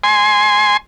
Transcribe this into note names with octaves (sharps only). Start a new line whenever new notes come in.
G#5 C6